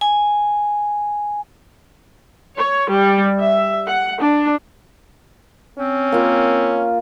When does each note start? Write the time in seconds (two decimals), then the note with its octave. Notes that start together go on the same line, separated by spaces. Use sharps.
0.01 G#5
2.58 C#5
2.91 G3
3.40 E5
3.88 F#5
4.22 D4
5.79 C4 C#4
6.12 A#3 F4